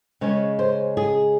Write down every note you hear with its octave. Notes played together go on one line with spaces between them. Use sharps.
C#3 G#3 C#4 C#5
C5
G#4